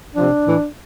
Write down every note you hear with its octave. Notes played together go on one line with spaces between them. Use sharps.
C3 F3 D4
A2 E3